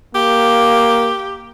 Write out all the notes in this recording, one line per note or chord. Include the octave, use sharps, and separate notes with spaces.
A#3 G4